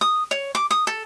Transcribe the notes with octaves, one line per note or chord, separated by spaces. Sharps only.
D#6
C#5
D6
D#6
A4